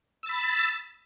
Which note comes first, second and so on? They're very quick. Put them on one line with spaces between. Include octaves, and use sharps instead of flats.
E6 A6 B5